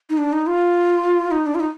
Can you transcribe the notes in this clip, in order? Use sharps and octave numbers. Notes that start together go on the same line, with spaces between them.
D#4
D4
D#4
F4
D#4
D4
F4
D#4